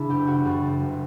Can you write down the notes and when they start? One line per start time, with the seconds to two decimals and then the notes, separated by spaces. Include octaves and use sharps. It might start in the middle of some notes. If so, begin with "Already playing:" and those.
Already playing: C#3 D4 E4
0.09 F#1 G4
0.27 C#3 F#4
0.45 F#2 G3
0.63 F#1
0.80 F#1